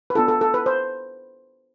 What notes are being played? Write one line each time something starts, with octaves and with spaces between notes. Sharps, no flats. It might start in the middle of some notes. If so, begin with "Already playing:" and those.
B4
B3 D4 F4 A4
A4
A4
B4
C5